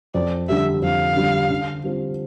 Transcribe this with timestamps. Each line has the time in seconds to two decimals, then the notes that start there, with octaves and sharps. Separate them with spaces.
0.14 F2 D5
0.49 D3 G3 E5
0.82 F2 F5
1.16 D3 G3
1.50 D3
1.84 G3 C4 F4